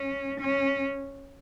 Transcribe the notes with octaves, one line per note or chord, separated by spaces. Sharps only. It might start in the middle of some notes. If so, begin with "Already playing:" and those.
Already playing: C#4
C#4